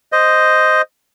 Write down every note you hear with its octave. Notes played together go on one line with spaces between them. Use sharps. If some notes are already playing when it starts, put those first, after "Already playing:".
C5 D#5